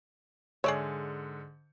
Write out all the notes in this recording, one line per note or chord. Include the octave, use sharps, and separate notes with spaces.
G#2 D3 G#4 C#5 D5 E5